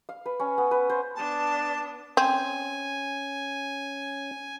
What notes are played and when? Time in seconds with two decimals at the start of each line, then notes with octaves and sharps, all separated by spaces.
0.09 F5
0.26 B4
0.40 C#4
0.58 B3
0.71 B4
0.90 C5
1.16 B3 D4 A5
2.17 C4 C#4 G#5